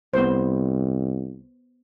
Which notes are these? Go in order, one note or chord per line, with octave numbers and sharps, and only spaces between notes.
C2 B3 C5